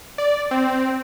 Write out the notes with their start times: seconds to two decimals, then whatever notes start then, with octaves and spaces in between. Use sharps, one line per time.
0.18 D5
0.51 C4